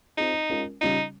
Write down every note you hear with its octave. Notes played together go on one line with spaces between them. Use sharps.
C4 D#4 F4 G#4
G#3 C#4 F4 A#4
C#3 G3 C#4 D#4 F4